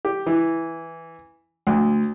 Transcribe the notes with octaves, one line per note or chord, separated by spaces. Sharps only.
G4
E3
D2